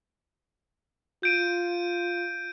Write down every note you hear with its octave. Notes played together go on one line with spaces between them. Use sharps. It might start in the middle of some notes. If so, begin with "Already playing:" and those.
F4 G6 D7 D#7